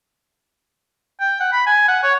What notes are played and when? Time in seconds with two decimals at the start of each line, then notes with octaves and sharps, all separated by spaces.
1.20 G5
1.40 F#5
1.53 B5
1.66 G#5
1.88 F#5
2.03 C#5